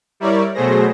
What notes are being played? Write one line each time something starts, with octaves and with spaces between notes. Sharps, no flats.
G3 E4 A#4 C#5 D5
B2 F#3 A3 G#4 C5 A#6